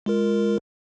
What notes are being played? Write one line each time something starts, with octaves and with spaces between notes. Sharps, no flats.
G#3 F4 A#4